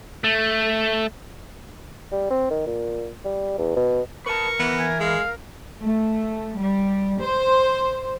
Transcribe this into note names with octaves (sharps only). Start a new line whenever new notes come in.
A3
G3
C4
D#3
A#2
G3
E2
B2
A#4 B4 A5 C#6
E3 B3
G#5
G#3 F5
A3
G3
C5